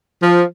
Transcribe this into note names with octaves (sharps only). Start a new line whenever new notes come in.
F3